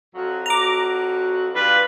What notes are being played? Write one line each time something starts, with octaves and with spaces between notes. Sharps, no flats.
F2 F#3 F#4
A#5 D6
G3 D4 F4 B4